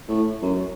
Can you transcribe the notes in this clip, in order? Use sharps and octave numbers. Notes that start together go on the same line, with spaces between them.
A2
F#2